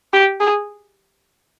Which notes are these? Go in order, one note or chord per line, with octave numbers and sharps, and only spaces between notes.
G4
G#4